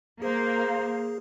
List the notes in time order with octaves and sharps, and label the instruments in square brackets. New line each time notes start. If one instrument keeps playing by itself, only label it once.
[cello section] A#3 [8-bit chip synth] G#4 [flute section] C5 F5 A#5